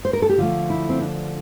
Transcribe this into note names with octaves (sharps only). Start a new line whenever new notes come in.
C5
A#4
A4
G4
D3 F3 A3 F4
E4
C4
D4